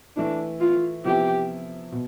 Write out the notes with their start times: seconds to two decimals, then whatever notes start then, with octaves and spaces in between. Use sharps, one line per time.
0.17 E3 A3 D4 E4
0.61 F4
1.05 C3 F3 B3 E4 G4
1.92 B2